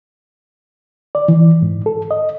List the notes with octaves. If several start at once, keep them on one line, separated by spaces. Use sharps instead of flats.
D5
E3
G#2
A4
D#5